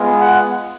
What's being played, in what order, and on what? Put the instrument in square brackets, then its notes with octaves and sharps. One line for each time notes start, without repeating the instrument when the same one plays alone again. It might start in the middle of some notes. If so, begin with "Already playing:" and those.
Already playing: [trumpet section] G#3 B3 F4
F#5